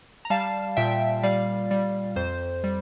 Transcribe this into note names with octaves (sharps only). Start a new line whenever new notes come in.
A#5
G3 F5 A5
A#2 E5 G5
G3 D5 F5
G3
F2 C5
G3